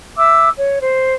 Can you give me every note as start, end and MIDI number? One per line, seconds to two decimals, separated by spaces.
0.18 0.50 76
0.18 0.50 86
0.18 0.50 88
0.58 0.79 73
0.79 1.14 72